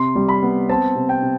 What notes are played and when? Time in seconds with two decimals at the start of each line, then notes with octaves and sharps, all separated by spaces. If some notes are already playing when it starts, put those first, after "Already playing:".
Already playing: C3 C6
0.15 G3
0.29 B5
0.43 B3
0.69 C4 A5
0.95 C3
1.09 G5
1.22 C3